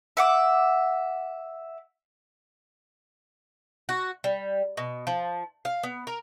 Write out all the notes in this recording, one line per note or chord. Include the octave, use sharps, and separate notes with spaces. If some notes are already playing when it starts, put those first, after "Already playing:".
E5 F#5 D6
F#4
G3
B2
F3
F5
B3
A#4